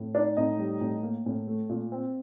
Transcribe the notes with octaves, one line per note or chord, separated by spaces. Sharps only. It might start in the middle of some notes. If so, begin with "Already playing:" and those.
Already playing: A2
D4 D#4 D5
A2 D#4 D#5
G3
A2
A#3
A2
A3
A#2
C4